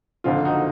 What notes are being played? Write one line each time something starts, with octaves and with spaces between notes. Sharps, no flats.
F#1 F2 D3 F3 F4
D#4 F#4